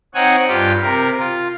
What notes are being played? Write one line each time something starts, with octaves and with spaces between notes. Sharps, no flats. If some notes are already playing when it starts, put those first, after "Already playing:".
C4 D#4 C#5 F#5 G#5
G2 F4 G4
C3 A#4
F4